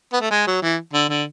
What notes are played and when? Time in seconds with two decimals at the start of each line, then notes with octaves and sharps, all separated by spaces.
0.13 B3
0.21 A3
0.30 G#3
0.47 F#3
0.62 E3
0.93 D3
1.09 D3